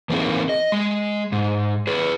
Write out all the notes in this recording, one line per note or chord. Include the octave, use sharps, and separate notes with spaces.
E3 A#3 C4 D#4 G#4
D#5
G#3
G#2
G#4 B4